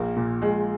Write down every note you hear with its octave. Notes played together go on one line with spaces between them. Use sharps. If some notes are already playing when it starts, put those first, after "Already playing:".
Already playing: A#1 A#3
A#2
A#1 G#3